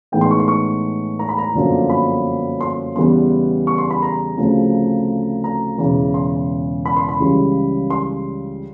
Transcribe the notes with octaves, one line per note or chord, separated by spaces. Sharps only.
A2 E3 G#3 B3 D#4 G5
C6
C#6
C6
C#6
A#5
B5
A#5
G1 F#2 D3 F3 A#3
B5
C6
E2 C#3 E3 G3 B3 C6
C#6
C6
B5
A#5
D2 C#3 F3 A3 C4
A#5
E1 E2 C#3 E3
C6
B5
C6
B5
C#2 C#3 E3 G3
C6